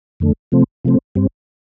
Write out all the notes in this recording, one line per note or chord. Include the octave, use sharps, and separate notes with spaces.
F2 D3 A3
C3 F3 A3 C4
C3 F3 A3 C4
G2 G3 C4